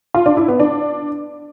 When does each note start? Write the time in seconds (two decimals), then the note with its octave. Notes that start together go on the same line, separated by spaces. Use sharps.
0.14 F4
0.26 D4
0.37 E4
0.48 B3
0.60 D4